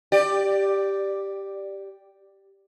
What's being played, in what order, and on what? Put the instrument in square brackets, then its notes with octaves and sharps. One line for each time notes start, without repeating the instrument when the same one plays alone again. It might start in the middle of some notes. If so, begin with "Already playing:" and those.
[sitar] G4 D5